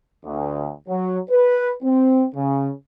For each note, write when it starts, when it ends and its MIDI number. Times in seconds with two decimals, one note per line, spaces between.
0.25 0.72 38
0.89 1.18 54
1.30 1.73 71
1.83 2.25 60
2.35 2.72 49